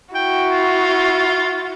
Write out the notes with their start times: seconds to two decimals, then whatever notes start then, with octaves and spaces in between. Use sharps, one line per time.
0.15 E4 F#4 G5
0.51 F4